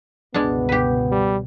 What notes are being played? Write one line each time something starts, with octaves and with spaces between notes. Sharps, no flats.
G1 C#2 B2 G#3 B3 D4
G4 B4
G3